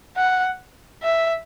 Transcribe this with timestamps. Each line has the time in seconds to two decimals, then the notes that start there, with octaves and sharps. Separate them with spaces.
0.17 F#5
1.03 E5